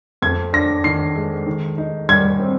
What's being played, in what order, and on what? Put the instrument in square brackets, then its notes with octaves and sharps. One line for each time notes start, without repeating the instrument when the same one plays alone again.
[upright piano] F2 G#6
D4 A#6
D#3 C7
G#3
D#3
D#4
G3 G#6
C4